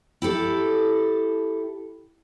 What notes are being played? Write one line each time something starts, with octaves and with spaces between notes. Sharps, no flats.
E4 G4 A4